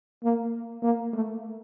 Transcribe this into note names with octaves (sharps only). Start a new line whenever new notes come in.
A#3
A#3
A3